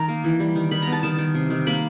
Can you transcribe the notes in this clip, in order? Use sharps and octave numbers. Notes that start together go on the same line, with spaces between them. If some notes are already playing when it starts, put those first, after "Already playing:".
Already playing: D#3 A#5
A#3
E3
G3
D#3
D#3 B5
B3 A#5
A5
D#3 A5
D#3
C3
D#3
A#3 B5